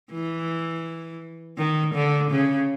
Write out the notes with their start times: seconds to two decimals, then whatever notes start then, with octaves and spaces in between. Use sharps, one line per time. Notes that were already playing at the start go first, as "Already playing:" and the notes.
0.12 E3
1.58 D#3
1.95 D3
2.31 C#3